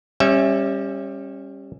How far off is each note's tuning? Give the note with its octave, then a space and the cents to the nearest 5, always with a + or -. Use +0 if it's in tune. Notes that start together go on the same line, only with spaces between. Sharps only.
G3 +15 C#4 -20 E5 +0